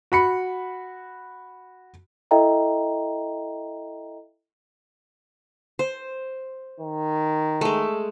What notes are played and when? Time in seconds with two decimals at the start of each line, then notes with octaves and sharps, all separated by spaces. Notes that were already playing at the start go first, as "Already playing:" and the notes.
0.12 F#4 B5 C#7
2.31 E4 A4 D#5 E5 G5 A#5
5.79 C5
6.80 D#3
7.61 G#3 A3